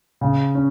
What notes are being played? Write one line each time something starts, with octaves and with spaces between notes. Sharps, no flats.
C#3
C#4